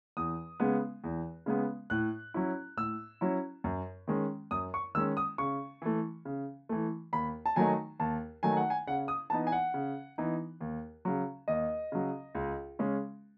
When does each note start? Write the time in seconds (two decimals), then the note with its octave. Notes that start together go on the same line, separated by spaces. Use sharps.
0.17 E2 D#6
0.60 C#3 G#3 B3
1.04 E2
1.46 C#3 G#3 B3
1.90 A2 F#6
2.34 F#3 C#4 E4
2.77 A2 E6
3.21 F#3 C#4 E4
3.64 F#2
4.07 D#3 G#3 C#4
4.51 F#2 D#6
4.74 C#6
4.95 D#3 G#3 C#4 E6
5.17 D#6
5.38 C#3 C#6
5.82 E3 A3
6.25 C#3
6.69 E3 A3
7.13 D#2 B5
7.46 A5
7.56 D#3 F#3 A3 D#4 G#5
8.00 D#2 A5
8.43 D#3 F#3 A3 D#4 G#5
8.57 F#5
8.70 G#5
8.87 C#3 F#5
9.08 D#6
9.30 E3 B3 D#4 A5
9.47 G#5
9.52 F#5
9.74 C#3
10.18 E3 B3 D#4
10.60 D#2
11.05 C#3 F#3
11.48 D#2 D#5
11.92 C#3 F#3
12.35 C#2
12.79 C#3 G#3 C#4